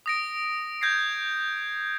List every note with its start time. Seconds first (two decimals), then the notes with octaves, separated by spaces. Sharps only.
0.06 D#6 A#6 D7
0.81 G6 G#6 A#6 C7